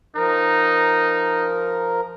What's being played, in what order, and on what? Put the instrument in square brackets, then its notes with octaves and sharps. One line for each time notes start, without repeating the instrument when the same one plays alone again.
[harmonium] F3 A#4 A#5 [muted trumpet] D#4